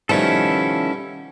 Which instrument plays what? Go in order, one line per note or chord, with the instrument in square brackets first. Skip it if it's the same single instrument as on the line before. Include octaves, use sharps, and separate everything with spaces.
[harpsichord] B2 G3 [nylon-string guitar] D#3 F3 A3 [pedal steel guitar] C#4 E4 A4